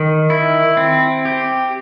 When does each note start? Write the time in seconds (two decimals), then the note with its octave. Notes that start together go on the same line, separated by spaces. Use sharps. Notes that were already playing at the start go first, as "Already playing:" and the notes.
Already playing: D#3
0.30 E4
0.77 C4
1.25 G4